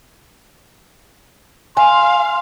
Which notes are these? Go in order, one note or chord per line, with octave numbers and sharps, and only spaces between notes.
F5 G#5 C6